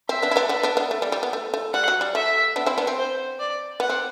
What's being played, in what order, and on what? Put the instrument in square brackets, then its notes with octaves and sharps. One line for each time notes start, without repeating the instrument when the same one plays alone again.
[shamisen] C4 [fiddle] E5
[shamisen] B3 D4
E4
B3 D4
B3 D4
B3 D4
B3 D4
A3
G3
G3
B3
A3
A3
[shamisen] G3 [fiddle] F#5
[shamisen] F#3
G3
[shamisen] A3 [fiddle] E5
[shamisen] B3 D4
C4 E4
B3 D4
C4
[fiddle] C5
D5
[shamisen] B3 [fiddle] F#5
[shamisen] C4